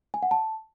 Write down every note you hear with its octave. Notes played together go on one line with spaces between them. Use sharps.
G#5
F#5
A5